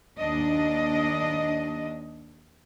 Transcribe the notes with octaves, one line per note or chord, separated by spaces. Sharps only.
D#2 D4 D#5